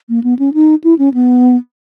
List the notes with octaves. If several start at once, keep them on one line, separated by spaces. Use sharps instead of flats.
A#3
B3
C#4
D#4
E4
C#4
B3